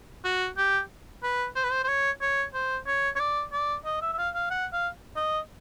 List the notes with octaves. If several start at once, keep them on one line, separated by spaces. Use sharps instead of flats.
F#4
G4
B4
C5
B4
C5
C5
C#5
C#5
C5
C#5
C#5
D5
D5
D#5
E5
E5
F5
F5
F#5
F5
D#5